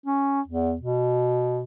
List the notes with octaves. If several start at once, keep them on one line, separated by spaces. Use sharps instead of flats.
C#4
E2
B2